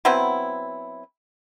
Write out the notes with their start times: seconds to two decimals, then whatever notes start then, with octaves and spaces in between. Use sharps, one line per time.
0.05 F#3 B3 C4 E4